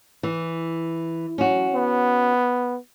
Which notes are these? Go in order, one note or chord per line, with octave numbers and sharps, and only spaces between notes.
E3
F#3 C#4 F#4
B3